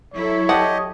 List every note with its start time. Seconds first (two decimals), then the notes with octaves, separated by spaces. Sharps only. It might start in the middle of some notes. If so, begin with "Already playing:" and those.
0.14 F#3 E4 A4 C#5
0.49 G4 D5 D#5 F#5 A5